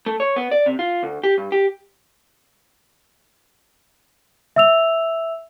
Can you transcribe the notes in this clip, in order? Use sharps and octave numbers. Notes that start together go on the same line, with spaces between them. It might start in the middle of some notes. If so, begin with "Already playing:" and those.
A3
C#5
B3
D5
C3
F4
D2
G4
G2
G4
E5 E6 F7